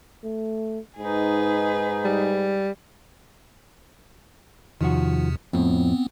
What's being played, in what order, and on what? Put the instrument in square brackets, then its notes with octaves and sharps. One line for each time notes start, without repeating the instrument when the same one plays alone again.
[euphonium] A3
[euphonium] G#2 [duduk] D#4 [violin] G#4 B4
[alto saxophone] G3
[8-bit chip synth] E2 C3 [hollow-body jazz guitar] D#3 F3 F#4
[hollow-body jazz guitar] F2 A2 [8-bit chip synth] B3 C4